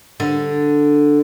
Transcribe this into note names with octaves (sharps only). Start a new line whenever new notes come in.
D3